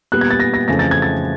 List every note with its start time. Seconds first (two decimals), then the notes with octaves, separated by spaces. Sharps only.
0.12 A#2 G3 B3 F#6
0.21 G#6
0.30 A6
0.40 A#6
0.54 A#6
0.68 F2 C#3 E3 A3 A#6
0.79 A6
0.91 G#6
1.02 A6